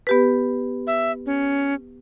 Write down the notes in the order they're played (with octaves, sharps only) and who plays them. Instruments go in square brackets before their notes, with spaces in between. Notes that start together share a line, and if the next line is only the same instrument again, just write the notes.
[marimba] B3 G4 B4
[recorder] E5
C#4